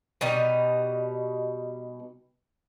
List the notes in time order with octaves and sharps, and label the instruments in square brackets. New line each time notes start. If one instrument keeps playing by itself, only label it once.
[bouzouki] B2 G3 D#4